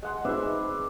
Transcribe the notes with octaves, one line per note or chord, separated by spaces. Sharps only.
G#3 F#5 C6
C4 D#4 G#4 B4 D5 E5